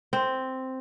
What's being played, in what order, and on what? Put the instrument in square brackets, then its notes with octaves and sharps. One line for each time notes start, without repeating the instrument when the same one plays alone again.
[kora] C4